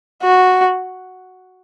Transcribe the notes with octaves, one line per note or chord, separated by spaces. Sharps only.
F#4